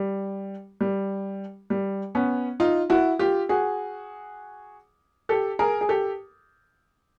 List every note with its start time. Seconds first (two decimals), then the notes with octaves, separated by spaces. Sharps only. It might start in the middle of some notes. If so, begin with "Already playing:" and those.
Already playing: G3
0.81 G3
1.70 G3
2.15 B3 C#4
2.60 D#4 F4
2.90 E4 F#4
3.19 F4 G4
3.49 F#4 G#4
5.29 G4 A4
5.59 G#4 A#4
5.81 G#4
5.89 G4 A4